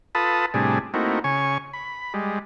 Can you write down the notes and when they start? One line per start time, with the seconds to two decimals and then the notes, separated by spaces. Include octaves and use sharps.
0.15 F4 A4 B4 A5 B5 D#6
0.54 A2 C3 G3 D4 G#4
0.94 A3 A#3 C4 D#4 E4 F#4
1.24 C#3 C#5 G#5 C#6
1.73 B5
2.14 G3 G#3